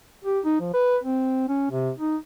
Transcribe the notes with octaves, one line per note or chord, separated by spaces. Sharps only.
G4
D#4
F3
B4
C4
C#4
C3
D#4